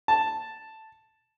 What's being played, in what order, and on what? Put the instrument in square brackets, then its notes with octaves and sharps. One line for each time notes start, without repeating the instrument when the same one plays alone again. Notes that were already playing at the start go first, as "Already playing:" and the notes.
[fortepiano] A5